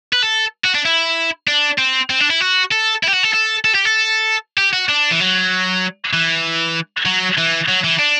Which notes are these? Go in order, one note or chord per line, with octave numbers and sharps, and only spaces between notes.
B4
A4
F#4
D4
E4
D4
C4
C4
D4
E4
F#4
A4
E4
G4
F#4
A4
A4
A4
G4
A4
G4
F#4
D4
E3
F#3
E3
F#3
E3
F#3
E3
D4